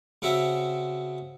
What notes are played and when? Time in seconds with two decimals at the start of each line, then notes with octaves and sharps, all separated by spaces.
0.22 C#3 C4 F#4 E5